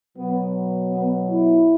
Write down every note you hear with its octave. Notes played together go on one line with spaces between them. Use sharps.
B2 F#3 B3
B3
E4